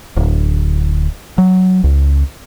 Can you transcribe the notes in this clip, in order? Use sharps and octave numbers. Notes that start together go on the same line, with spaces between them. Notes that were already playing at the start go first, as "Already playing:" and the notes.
D1
F#3
C#2